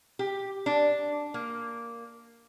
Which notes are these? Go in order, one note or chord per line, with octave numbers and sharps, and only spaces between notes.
G4
D4
A#3